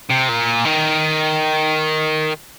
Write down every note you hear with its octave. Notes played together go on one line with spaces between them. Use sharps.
C3
A#2
D#3